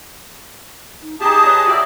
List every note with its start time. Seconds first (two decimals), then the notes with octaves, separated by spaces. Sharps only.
1.03 D#4
1.20 D#4 G4 G#4 A5 D#6
1.43 B4 C#5 D#5
1.67 F#4 G4 D5 E5